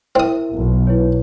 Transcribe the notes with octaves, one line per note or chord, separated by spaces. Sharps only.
C4 E4 A#4 E5 D#6
B1
E4 B4 C#5